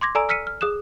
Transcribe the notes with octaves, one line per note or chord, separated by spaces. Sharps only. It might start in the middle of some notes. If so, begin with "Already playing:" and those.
C6 D6 G#6 A#6
A4 D5 G#5 A#5 E6 D7
E6 F6 B6 C#7 D#7
F6
G#4 D#6 F#6 E7